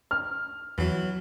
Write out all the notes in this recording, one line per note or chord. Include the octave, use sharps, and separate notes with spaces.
F6
E2 E3 F#3